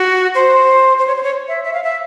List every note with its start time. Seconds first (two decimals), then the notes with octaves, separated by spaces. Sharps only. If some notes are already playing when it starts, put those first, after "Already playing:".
Already playing: F#4
0.35 C5
0.99 C5
1.07 C#5
1.16 C5
1.23 C#5
1.48 E5
1.64 E5
1.73 F5
1.84 E5